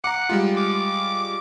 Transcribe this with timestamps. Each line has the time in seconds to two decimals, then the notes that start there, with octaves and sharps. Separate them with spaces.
0.04 F#5 A#5 D6
0.29 G3 G#3 F4
0.57 D6